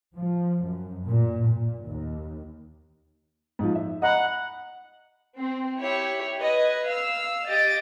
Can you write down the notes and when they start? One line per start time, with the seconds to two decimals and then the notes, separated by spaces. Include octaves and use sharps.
0.15 F3
0.65 F#2
1.08 A#2
1.49 A#2
1.89 D#2
3.59 G#2 F3
3.75 E5
4.02 D#5 F#5 A#5 B5
5.39 C4
5.82 E4 G4 C#5
6.41 B4 D#5 G#6
6.87 F5 E6
7.49 G4 D#5 A6 D7